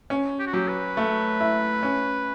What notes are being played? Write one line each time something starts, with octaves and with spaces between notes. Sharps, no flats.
C#4
G4
F#4
F#3 G4
B4
A3
E4
C#4